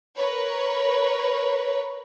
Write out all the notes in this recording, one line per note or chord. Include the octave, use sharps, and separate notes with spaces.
A#4 B4 C#5